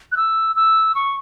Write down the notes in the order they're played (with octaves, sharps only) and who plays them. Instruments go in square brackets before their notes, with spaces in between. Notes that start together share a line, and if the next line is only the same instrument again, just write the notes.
[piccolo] F#6
E6
E6
C#6